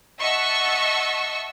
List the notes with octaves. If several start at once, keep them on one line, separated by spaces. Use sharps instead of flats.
D#5 E5 F#5 A5 C#6 E6